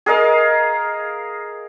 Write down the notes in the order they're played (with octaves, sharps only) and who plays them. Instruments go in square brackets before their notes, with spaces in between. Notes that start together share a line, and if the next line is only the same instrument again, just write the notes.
[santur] G#4 A#4 D#5 F5